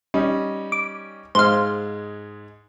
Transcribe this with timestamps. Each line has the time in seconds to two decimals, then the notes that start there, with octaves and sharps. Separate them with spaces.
0.14 G3 C#4 D#4
0.72 D6
1.35 G#2 G#3 C5 F5